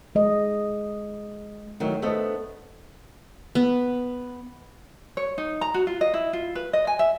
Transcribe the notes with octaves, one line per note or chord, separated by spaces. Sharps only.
G#3 D#5
D#3 F#3 A3
A3 B3 D4 A4 C5 D#5
B3
C#5
D#4
A#5
F#4
F4
D#5
E4
F4
B4
D#5
G#5
E5